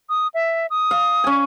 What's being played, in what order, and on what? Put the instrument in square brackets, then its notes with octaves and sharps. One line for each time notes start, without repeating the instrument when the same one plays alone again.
[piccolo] D#6
E5
D#6
[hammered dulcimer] F5
C#4 G#5